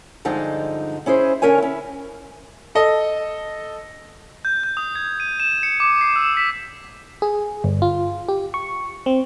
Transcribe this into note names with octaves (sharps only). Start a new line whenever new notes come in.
G2 D3 F3 G#3 D#4
C#4 E4 G#4 C5
D3 C#4 A#4 C#5 G#5
C#4 E4
A4 D#5
G6
G6
D#6
G#6
D#7
E7
C#7
D6
C7
E6
B6
G#4
G1
F4
G4
C#6
C4